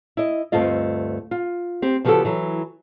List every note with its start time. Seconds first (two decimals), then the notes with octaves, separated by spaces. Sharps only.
0.17 E4 D#5
0.52 D2 G2 A3 C4 F4 D#5
1.31 F4
1.82 C4 G4
2.05 C#3 F3 B3 F#4 G4 A4
2.25 E3 F#3